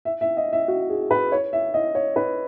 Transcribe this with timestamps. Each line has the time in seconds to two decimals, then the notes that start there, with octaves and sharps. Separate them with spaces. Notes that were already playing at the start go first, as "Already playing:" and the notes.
0.05 E5
0.21 E5
0.37 D#5
0.53 E5
0.68 F#4
0.90 G#4
1.11 B4
1.32 C#5
1.53 E5
1.74 D#5
1.95 C#5
2.16 B4